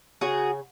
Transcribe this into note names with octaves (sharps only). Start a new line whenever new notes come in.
C#3 F#4 G#4